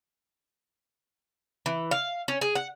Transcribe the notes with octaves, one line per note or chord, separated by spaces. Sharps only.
E3
F5
C#4
G#4
F#5